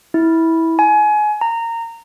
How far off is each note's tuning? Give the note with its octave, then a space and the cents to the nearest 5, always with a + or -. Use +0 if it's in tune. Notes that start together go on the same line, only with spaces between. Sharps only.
E4 -15
G#5 +25
A#5 -20